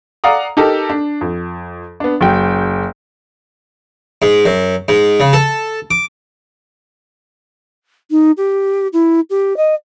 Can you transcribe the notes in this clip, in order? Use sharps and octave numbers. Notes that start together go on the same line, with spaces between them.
D5 F5 F#5 A#5 D#6
D#4 G4 A4 A#4
D4
F2
B3 D4
F#1 F#3 G5
G#2
F#2
G#2
C#3
A4
D6
D#4
G4
E4
G4
D#5